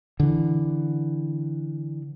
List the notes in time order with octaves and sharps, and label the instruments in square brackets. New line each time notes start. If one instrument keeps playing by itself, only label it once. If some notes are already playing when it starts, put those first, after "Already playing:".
[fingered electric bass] D3 E3